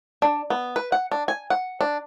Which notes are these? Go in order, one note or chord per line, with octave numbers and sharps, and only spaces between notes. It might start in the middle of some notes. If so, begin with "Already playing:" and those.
D4
B3
B4
F#5
D4
G#5
F#5
D4